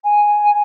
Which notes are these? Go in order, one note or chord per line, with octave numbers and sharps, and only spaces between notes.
G#5